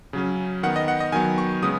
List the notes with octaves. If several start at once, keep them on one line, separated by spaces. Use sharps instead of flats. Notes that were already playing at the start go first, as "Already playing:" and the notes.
C#3 F#3 C#4
D#3 B3 F#5
D#5
F#5
D#5
D#3 F#3 B3 G#5
C#6
C#3 G#3 B3 D#6